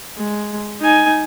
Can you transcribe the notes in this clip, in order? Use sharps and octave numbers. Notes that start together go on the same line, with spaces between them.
G#3
D#4 G#5